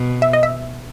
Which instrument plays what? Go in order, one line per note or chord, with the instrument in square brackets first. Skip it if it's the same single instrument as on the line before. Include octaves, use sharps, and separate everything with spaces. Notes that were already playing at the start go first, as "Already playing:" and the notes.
Already playing: [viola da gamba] B2
[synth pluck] E5
D#5
E5